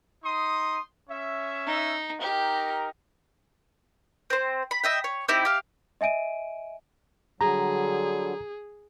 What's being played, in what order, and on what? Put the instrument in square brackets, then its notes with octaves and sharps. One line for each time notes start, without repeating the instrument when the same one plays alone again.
[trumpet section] D#4 C6 D#6
C#4 E5
[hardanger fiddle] D#4
[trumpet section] D#4 A#4 [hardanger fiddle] G4
[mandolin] C4 C5
B5
D#5 E5 G5
C#5
C4 D#4 E4 G4
G4 F5
[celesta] D#5 E5 G#5 D7 D#7
[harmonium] D3 F#3 G3 [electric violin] G#4 [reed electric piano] A#5